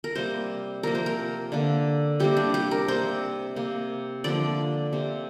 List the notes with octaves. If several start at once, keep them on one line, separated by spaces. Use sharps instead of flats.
A#4
C3 G3 A#3 C5
C3 F3 A#3 A#4
C5
A#4
D3 A#3
C3 G3 A#3 G4
D4
G4
A#4
C3 A#3 C5
C3 A#3
D3 F3 A#3 D5
C3 A#3